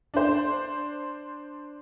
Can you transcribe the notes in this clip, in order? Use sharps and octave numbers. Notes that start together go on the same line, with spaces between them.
D4 C5